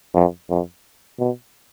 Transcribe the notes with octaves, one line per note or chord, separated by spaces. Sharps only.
F2
F2
B2